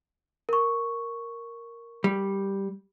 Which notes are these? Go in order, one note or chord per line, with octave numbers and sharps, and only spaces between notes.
A#4 C#6
G3